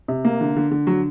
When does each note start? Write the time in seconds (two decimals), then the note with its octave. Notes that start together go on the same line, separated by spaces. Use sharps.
0.08 C3
0.25 A#3
0.41 D3
0.56 D3
0.71 D3
0.87 F#3